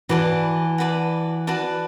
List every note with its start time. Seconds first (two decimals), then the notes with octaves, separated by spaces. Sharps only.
0.09 E3 F#4 B4 D5 A5
0.78 F#4 B4 D5 A5
1.47 F#4 B4 D5 A5